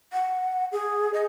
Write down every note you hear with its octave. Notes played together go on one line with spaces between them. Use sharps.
F#5
G#4
D#5